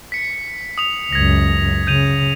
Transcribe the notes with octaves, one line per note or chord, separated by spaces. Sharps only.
B6 C#7
D#6 F7
C#2 F#2 G#6 A#6
C#3 G6 D#7 F7